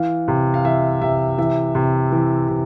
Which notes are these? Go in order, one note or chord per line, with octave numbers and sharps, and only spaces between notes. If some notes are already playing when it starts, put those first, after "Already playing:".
Already playing: E3 F5
C3
F5
E3 E5
C3 E5
E3 E5
C3
E3
C3